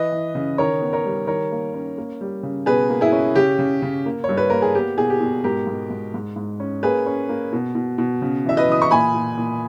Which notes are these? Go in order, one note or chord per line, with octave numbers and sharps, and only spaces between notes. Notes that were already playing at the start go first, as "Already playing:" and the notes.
Already playing: E3 B4 D#5
E3
C#3
D#3 A#4 C#5
B3
A#4 C#5
G3
D#3 A#4 C#5
A#3
C#4
A#3
G3
C#3
B2 G#4 B4
A#3
E4 G#4
C#4
C#3 G4
C#3
C#3
A#3
G2 C#5
B4
A#3 A#4
G#4
B3 G4
B2 G#4
G4
B2
G#2 G4 A#4
G#2
G#2
G#2
G#2
C#4
A#3 G#4 B4
C#4
A#3
B2
B2
B2
C#3
E3 E5
B4 D#5
E3 D#6
C#6
A#2 G#5 B5
A#2
A#2